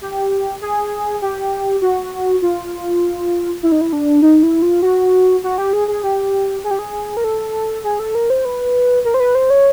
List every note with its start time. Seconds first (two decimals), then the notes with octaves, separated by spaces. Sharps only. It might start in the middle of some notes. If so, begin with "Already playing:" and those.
0.01 G4
0.62 G#4
1.22 G4
1.82 F#4
2.42 F4
3.63 E4
3.72 D#4
3.81 E4
3.93 D4
4.22 D#4
4.43 E4
4.62 F4
4.82 F#4
5.44 F#4
5.58 G4
5.73 G#4
5.88 G#4
6.03 G4
6.64 G#4
6.71 G4
6.79 G#4
7.17 A#4
7.24 A4
7.84 G#4
8.00 A4
8.15 A#4
8.30 C5
8.45 B4
9.05 A#4
9.14 C5
9.20 B4
9.35 C5
9.50 C#5